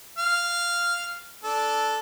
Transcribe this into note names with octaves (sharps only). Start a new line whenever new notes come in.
F5
D4 A4